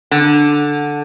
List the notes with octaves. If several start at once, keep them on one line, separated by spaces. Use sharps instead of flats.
D3